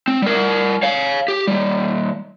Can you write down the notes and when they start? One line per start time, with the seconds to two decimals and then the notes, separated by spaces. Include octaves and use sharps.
0.08 C4
0.22 G3 A#4
0.83 C#5 F5
1.28 G4
1.47 G3 A#3